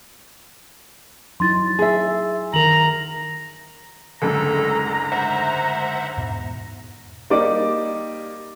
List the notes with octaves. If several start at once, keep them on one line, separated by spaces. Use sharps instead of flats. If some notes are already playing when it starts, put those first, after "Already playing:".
F#3 D#4 E4 C6 A6
G#4 E5
D#3 A#4 A#5 F7 F#7
F#1 D2 G#2 A4 A#5
C5 E5 F#5
E2 G#2 B2
G3 A#3 D#4 D5 D6